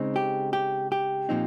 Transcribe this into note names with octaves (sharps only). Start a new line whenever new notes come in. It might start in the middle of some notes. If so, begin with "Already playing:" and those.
Already playing: C#3 G#3 C4 D#4
G4
G4
G4
A#2 F3 C4 D#4